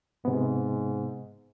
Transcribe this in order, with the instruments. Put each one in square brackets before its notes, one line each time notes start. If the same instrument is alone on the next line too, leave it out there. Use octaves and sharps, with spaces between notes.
[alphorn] G#2 [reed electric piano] C3 B3